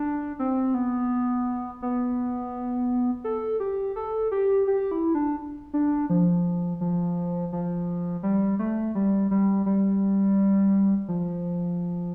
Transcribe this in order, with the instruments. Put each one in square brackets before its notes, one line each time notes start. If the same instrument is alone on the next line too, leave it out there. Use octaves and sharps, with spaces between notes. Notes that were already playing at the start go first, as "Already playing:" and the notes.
Already playing: [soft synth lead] D4
C4
B3
B3
A4
G4
A4
G4
G4
E4
D4
D4
F3
F3
F3
G3
A3
G3
G3
G3
F3